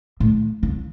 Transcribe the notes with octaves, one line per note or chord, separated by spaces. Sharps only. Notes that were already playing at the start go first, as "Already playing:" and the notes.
A2
C#3